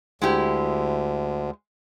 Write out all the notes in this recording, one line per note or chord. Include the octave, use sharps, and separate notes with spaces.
D2 G#3 E4 G4